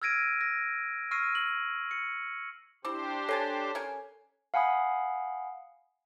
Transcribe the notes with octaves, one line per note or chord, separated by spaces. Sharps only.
E6 F6 G#6 A#6 D7 D#7
A#6
C#6 E6 F6 A#6 C7 D#7
F6 F#7
C#7
C4 D4 E4 G4 C5 D6
C4 A4 C#5 G#5 A5 C7
C#4 A#4 G#5
F5 F#5 G#5 B5 D#6